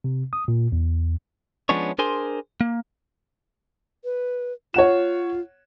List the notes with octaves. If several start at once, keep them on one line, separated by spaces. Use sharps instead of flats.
C3
D#6
A#2
E2
F3 G#3 B3 C#4 D4 C#5
D4 G#4 A#4 C5 G#5 C6
A#3
B4
F4 C#5 F#5 E7